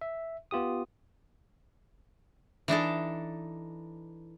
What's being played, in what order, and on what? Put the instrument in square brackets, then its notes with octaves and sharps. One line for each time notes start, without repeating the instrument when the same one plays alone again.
[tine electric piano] E5
B3 F4 G4 D#6
[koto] E3 D4 D#4 A4